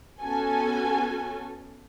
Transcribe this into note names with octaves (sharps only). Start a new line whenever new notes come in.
B3 C#4 F#4 A4 G#5